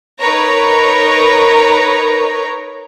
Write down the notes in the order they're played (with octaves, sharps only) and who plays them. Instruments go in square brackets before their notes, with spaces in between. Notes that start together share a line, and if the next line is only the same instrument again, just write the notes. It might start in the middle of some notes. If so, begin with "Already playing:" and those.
[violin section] D#4 A#4 B4 C#5 A#5